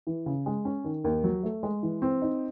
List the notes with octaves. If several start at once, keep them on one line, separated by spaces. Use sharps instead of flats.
E3
C#3
G#3
C#4
D#3
D#2
F#3
A3
G#3
E3
C4
D#4